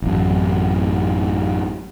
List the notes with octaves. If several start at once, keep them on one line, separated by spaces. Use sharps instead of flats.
A1 F#2